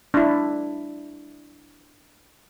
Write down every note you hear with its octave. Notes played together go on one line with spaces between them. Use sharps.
D4 E4